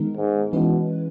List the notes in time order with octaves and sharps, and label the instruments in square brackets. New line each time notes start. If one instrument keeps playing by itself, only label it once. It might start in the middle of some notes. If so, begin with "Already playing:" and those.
Already playing: [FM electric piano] D#3 G#3 B3 D#4 A#4
[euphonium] G#2
[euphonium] B2 [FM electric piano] E3 G#3 C#4 E4 B4